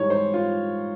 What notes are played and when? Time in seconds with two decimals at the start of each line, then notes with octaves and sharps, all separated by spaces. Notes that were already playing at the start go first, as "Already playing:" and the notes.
Already playing: G#2 E3 G3 C#5
0.10 C5
0.34 F4